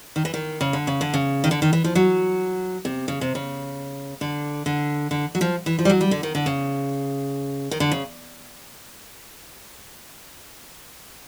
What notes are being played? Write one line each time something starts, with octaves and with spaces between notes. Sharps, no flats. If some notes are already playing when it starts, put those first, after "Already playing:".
D#3
E3
D#3
C#3
D3
C#3
D3
C#3
D#3
D3
D#3
E3
F3
F#3
C3
C#3
C3
C#3
D3
D3
D3
F#3
F3
E3
F3
G3
F#3
G3
D3
D#3
D3
C#3
D#3
D3
C#3